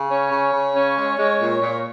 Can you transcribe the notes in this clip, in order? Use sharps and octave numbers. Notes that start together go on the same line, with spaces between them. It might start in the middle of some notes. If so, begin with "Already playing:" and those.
Already playing: C#3
C#4 C#5
C#3
C#3
C#4
G#3
G#3
A#2
A#2